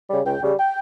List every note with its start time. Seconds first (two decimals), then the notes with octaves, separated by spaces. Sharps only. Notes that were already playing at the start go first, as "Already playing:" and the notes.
0.09 C#3 G3
0.25 C#2 G5
0.42 C#3 G3
0.58 G5